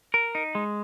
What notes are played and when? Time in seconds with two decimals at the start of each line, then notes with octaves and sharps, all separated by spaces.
0.14 A#4
0.35 D#4
0.55 G#3